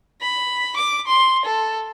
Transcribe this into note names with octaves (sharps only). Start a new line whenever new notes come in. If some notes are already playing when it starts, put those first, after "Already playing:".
B5
D6
C6
A4